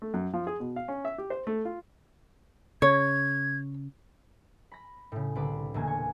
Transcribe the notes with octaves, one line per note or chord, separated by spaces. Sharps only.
A3
F#2
F3
G#4
B2
F5
C#4
E5
G4
C5
A3
F4
C#3 C#5 G#6
B5 A#6
A2 C#3
C2 D3 B4 B5 C6 D6
E1 A#2 D3 A3 A#3 G#5
G#5 C#6